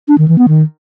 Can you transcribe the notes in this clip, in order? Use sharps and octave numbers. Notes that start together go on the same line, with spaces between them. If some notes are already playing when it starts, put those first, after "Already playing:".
D4
D#3
E3
B3
D#3